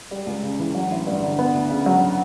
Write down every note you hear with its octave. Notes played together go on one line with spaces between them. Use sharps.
G3
C#2
C#3
E3
F#3
A1
G2
D3
B3
D2
C#3
F#3